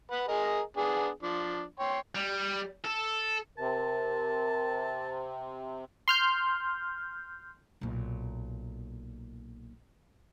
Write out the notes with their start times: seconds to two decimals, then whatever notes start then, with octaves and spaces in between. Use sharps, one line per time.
0.12 B4 F#5
0.28 G#4 A#4 D#5
0.77 B3 D4 G#4
1.23 F3 D4
1.79 C#5 G5 C6
2.15 G3
2.85 A4
3.58 C3 A#4 A5
6.08 C6 F6 G6
7.81 B1 A#2